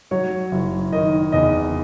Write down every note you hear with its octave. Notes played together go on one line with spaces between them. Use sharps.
F#3 C#5
F#1
D#3 D#5
E2 D#5